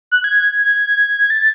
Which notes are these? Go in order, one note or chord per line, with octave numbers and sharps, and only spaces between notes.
F#6
G#6
A6